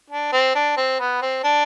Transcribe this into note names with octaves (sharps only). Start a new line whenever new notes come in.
D4
C4
D4
C4
B3
C4
D4